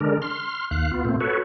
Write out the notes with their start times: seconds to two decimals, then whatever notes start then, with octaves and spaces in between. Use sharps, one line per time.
0.01 D3 G#3 D4 A#4
0.22 C6 F6
0.71 D#2 F5 F#6
0.91 B3 F4
1.05 A#2 A3 C4
1.20 F#4 A4 B4 C#5